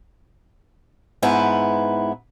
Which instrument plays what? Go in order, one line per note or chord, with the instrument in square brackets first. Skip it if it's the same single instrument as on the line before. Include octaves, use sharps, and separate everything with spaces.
[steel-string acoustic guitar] G#2 B3 E4 B4